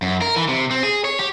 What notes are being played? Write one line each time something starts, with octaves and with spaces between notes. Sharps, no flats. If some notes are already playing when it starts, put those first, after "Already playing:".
F#2
A#4
E3
C3
C4
G#4
C#5
G4